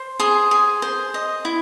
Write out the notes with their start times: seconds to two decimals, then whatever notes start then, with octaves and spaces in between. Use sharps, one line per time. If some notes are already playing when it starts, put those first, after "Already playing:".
Already playing: C5
0.20 G#4 C6 D#6
0.51 G#4
0.82 C5
1.14 D#5
1.45 E4